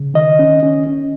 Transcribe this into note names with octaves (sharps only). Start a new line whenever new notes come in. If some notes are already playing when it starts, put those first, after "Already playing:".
Already playing: C#3
D#3 D#5
C#4
C#4
C#4